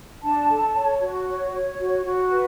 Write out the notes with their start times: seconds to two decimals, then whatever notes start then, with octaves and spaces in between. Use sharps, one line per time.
0.23 D4 A5
0.49 A4
0.75 C#5
1.01 F#4
1.28 C#5
1.54 C#5
1.79 F#4
2.05 F#4
2.32 B4